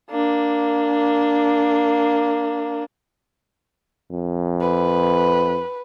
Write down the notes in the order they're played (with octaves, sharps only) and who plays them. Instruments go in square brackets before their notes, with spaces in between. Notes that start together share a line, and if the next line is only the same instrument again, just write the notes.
[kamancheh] A#3 D4
[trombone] F2
[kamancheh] B4